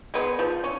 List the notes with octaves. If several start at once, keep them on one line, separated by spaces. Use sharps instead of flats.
G#3 B3
F3
C#4